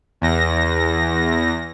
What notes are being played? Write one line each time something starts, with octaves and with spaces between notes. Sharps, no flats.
E2 A#6